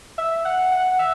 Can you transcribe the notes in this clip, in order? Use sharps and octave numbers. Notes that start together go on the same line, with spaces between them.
E5
F#5
F#5
E5